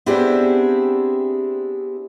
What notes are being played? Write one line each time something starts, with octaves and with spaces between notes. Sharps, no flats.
B3 C4 D4 E4 G4 G#4